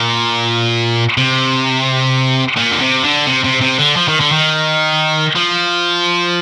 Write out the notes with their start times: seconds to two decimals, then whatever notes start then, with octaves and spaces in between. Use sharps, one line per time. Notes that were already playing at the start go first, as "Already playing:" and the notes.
Already playing: A#2
1.18 C3
2.57 A#2
2.71 D3
2.80 C3
3.03 D3
3.26 C3
3.44 C3
3.61 C3
3.79 D3
3.96 F3
4.08 D#3
4.20 D3
4.32 D#3
5.36 F3